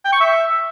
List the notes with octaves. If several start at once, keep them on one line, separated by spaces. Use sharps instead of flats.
G5
C#6
E5